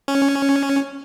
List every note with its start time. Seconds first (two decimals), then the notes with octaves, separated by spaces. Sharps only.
0.08 C#4